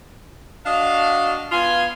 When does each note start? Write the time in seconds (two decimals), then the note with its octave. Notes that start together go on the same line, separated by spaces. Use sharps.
0.66 D4 F#4 D#5 F5
1.52 B3 F4 G#5